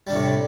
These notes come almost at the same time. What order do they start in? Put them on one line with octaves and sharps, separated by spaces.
G3 D4 C3 A2